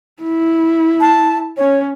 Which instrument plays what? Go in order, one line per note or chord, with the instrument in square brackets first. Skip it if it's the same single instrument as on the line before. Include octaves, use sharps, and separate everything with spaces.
[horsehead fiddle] E4
[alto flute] A5
[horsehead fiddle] C#4 [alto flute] C#5